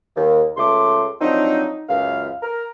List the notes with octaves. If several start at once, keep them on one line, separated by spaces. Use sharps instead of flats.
D#2
C#2 A3 C6 D6
F3 F#3 C4 D4 D#4
C#2 F#2 F5
A#4